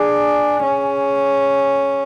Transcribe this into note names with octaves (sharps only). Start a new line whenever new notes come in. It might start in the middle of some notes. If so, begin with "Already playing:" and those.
Already playing: D4 G#4
C#4